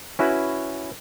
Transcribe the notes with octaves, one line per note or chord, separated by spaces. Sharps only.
C#4 E4 F#4 B4